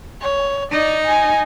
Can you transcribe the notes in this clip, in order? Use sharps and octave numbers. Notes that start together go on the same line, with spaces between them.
C#5
D#4 D5
G#5